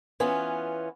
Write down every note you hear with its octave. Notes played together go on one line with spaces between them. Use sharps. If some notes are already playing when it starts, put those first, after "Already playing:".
E3 B3 C#4 F4